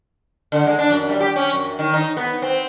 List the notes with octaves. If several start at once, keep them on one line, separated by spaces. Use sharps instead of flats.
D3
G#3
D4
F#2
G3
G4
C#4
F#2
D#3
D#4
B3
C4